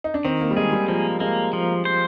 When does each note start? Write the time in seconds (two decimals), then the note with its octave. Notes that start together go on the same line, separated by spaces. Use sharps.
0.04 D#4
0.14 D4
0.25 D#3 C4
0.41 A#3
0.51 G3
0.57 G#3 G#4
0.72 G3
0.88 F3 A#3
1.20 G#3 A#3
1.53 F3
1.85 C5